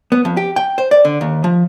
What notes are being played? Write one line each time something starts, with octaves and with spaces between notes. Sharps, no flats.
B3
F2
G4
G5
C5
D5
D3
D#2
F3